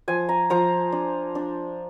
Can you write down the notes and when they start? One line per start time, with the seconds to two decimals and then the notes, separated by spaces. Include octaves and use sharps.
0.08 F3 G#5
0.29 A#5
0.50 F3 A#5
0.92 D4
1.35 D4